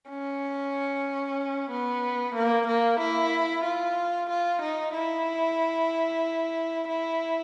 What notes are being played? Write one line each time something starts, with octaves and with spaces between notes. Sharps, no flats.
C#4
B3
A#3
A#3
E4
F4
F4
D#4
E4
E4